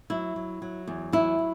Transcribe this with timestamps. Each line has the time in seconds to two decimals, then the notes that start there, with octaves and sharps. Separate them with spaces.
0.10 F#3 E4
0.36 F#3
0.62 F#3
0.87 E2
1.12 F#3 E4
1.39 F#3